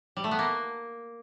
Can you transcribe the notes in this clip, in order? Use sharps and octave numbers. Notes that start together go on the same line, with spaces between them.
G3
A3
B3
A#3